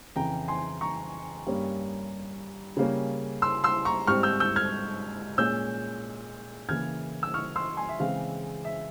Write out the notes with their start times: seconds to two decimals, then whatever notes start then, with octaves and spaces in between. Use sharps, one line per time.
0.16 F2 C#3 E3 G5 A#5
0.48 G#5 C6
0.81 A#5 C#6
1.47 G2 G3 A#3 C#4
2.77 C#3 G3 A#3 C#4
3.42 C6 E6
3.64 C6 E6
3.85 A#5 C#6
4.07 G#2 G3 C4 C#6 F6
4.23 E6 G6
4.40 E6 G6
4.56 F6 G#6
5.38 A#2 G#3 C#4 E6 G6
6.69 C#3 E3 A#3 F6 G#6
7.23 E6
7.34 C#6 F6
7.56 C6 E6
7.77 G#5 C6
7.89 E5
8.00 C#3 E3 G#3 C4 F5
8.65 E5